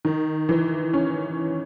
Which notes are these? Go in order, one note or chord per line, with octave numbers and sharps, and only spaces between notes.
D#3
E3
C#4